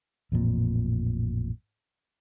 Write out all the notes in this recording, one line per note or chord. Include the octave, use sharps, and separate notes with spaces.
A1 F2 A#2